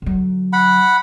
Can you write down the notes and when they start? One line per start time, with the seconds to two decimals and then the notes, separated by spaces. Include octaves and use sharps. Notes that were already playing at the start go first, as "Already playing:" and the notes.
0.02 D3 F#3
0.53 F#5 B5